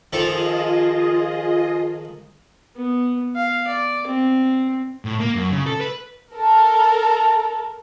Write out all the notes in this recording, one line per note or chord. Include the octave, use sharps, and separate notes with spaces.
D#3 F3 F4 G#4 A4 D#5
B3
F5
D5
C4
A2
A#3
F#2
C#3
A4
B4
A4 A#4